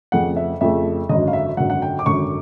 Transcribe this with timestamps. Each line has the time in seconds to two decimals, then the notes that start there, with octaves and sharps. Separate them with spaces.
0.12 F2 C#3 F3 A3 F#5
0.36 E5
0.61 F2 C#3 F3 A3 E5
1.09 G#1 F#2 D3 D#5
1.28 F5
1.33 E5
1.57 G#1 F#2 D3 F#5
1.70 F#5
1.82 G5
1.99 D6
2.06 G#1 F#2 D3 C#6